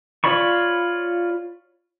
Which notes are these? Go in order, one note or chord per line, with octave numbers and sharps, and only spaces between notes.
F4 C#5 D5 B5 C#6